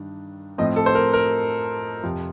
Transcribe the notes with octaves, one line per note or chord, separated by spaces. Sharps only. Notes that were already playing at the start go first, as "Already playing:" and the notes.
Already playing: G2 D#3 D4
A2 F3 C4 D#5
A4
C5
A#4
A#4
F2 C3 F3